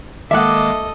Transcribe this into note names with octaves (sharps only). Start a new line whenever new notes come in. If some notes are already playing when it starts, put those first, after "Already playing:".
D#3 G#3 A#3 A4 D#5 E5 F#5 D6